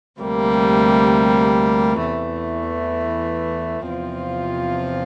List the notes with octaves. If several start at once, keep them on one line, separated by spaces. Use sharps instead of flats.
D2 C3 G3 A#3
E2 E3 A3
E2 C3 F3 C4 F4